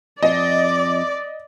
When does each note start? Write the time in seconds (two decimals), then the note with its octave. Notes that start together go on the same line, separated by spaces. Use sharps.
0.23 F2 D5 D#5